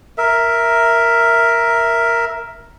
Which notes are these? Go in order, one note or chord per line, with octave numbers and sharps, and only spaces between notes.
A#4 E5